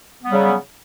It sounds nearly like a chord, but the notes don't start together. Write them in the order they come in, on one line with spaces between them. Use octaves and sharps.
B3 F#3 G3 C#3